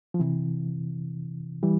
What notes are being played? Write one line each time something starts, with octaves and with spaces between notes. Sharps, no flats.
F3
C3 E3
E3 G3